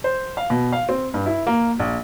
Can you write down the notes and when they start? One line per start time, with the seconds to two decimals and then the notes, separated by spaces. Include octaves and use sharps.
0.04 C5
0.37 F5
0.50 B2
0.72 F5
0.89 C4
1.14 G2
1.26 E4
1.47 A#3
1.79 A#1